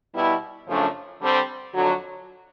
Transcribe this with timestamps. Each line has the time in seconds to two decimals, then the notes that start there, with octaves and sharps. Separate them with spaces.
0.14 B2 G3 B3 E4
0.67 F#2 C#3 F3 A3 D4
1.20 D3 G3 C4
1.74 F2 D3 F#3